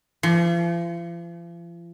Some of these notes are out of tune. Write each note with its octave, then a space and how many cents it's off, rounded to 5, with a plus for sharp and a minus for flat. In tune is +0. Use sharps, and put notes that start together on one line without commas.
F3 -40